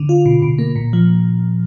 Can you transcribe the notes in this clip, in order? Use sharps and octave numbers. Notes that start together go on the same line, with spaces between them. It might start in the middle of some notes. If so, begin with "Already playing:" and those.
Already playing: D3
F4
B2
B2
A#3
A#2
F3